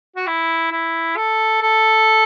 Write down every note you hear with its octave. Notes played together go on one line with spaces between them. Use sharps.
F#4
E4
E4
A4
A4